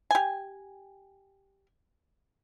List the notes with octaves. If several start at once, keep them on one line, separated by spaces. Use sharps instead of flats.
G4 G#5